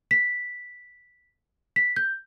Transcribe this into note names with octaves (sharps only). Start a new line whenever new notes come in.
B6
B6
G6